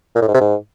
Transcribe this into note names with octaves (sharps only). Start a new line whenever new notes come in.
A#2
A2
G#2
C3
G#2